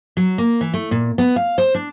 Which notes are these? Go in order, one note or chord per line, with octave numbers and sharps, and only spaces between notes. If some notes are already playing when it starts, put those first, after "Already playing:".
F#3
A#3
E3
A3
A#2
B3
F5
C5
D4